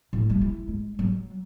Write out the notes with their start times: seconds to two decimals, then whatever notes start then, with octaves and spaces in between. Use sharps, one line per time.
0.13 A2
0.30 G3
0.41 E4
0.68 G#3
0.99 F#3